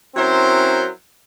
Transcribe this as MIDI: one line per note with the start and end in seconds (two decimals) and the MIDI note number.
0.15 0.88 54
0.15 0.88 60
0.15 0.88 61
0.15 0.88 64
0.15 0.88 70
0.15 0.88 72